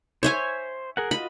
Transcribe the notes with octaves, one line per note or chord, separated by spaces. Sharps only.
C5 C#5 E5 G#5
G#4 A#4 F#5
F4 F#4 D#5 B5